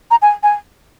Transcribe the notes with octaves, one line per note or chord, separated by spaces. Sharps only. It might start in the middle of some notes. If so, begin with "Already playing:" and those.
A#5
G#5
G#5